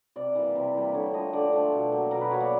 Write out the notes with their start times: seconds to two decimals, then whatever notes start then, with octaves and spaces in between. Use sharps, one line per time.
0.16 C3 D5
0.35 E3 G3 A#3
0.55 C3
0.75 E3 G3 A#3
0.93 D3 C#5
1.14 F3 A3 D#5
1.33 D3 D5
1.53 F3 A3
1.72 B2
1.92 F#3 A#3
2.11 B2 A#4
2.21 B4
2.31 F#3 A#3 C#5
2.40 D5